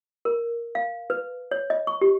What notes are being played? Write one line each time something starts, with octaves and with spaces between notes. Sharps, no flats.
A#4
F5
B4
C#5
D#5
C#6
G4